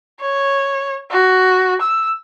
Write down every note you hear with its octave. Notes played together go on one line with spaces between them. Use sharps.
C#5
F#4
E6